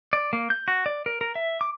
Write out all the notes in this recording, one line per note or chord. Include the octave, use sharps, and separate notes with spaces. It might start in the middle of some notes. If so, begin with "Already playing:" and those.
D5
A#3
G6
F#4
D5
A#4
A#4
E5
D6